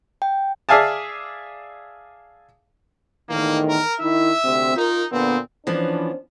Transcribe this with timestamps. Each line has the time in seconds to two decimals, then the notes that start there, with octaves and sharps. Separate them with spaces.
0.22 G5
0.69 G#4 D5 E5 F5 G#5 A5
3.29 E2 A2 D#3 A#3
3.69 A#4
4.00 D#3 D#4 E4 E5
4.44 D2 C3 C4
4.76 D#4 F4 A#4
5.12 A#2 D3 B3 C4
5.67 E3 F3 B3 C#4 D4 C5